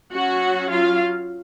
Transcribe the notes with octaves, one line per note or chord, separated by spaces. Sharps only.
F#3 C#4 F#4 F#5
F4 F5